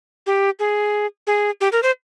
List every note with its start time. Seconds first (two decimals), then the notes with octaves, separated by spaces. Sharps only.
0.26 G4
0.59 G#4
1.27 G#4
1.61 G4
1.72 A#4
1.83 C5